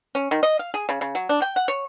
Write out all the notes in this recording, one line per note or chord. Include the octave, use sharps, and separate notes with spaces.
C#4
D#3
D#5
F5
G#4
C#3
C#3
F#3
D4
G5
F#5
C#5